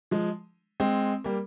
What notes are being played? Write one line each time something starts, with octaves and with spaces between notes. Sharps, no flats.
F3 G#3
G#3 C4
G3 A#3